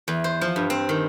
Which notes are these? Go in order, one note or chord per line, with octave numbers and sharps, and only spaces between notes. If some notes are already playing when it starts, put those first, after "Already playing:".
E2
C5
F3
G2
C4
D#3